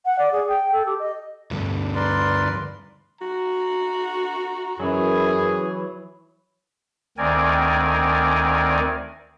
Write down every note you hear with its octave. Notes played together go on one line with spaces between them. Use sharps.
F#5
D5
G#4
G5
A4
G4
D#5
D2 G2
A#4 B4 D5 C6
F#4 A#5
F#2 E3 F#3 G#4
D2 D#3 C4 A#4 D5 G#5